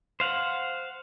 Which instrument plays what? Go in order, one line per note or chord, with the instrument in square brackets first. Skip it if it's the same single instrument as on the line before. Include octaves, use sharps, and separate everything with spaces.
[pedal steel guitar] C5 F5 F#5